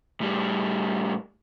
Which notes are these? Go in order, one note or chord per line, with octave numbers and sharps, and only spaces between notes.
A2 G3